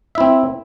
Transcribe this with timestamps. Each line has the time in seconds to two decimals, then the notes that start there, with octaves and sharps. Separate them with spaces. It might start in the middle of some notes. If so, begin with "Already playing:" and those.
0.15 E5
0.18 E4
0.20 C4